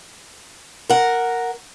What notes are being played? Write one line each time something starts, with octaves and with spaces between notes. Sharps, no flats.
A#4 F#5